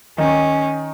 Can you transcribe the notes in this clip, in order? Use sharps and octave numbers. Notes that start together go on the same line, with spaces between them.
D#3 C#4 D#4